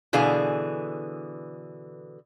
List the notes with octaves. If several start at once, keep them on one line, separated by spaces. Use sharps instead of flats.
B2 D3 E3 G#4 F5 G#5